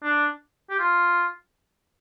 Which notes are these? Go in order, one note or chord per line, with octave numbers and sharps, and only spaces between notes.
D4
G4
F4